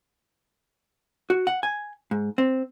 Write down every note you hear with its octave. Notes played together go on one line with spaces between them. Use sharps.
F#4
F#5
G#5
G#2
C4